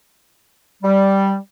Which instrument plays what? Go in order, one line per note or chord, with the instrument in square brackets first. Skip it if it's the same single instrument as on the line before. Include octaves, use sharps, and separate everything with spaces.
[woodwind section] G3